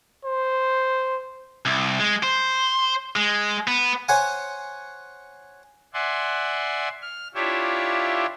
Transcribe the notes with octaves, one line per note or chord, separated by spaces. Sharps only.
C5
C2
G#3
C5
G#3
B3
C5 C#5 F#5 G#5
D5 E5 F#5 G#5 C6
F6
D4 E4 F4 G4 C#5 E5